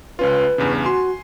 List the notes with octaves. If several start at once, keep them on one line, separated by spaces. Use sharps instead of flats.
C#2 C#4 F4 B4
E2 G2 C#3
F#4 G#5 C6